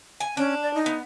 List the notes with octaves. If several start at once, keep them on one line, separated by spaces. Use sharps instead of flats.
G#5
C#4 D4
D5
D#4
B3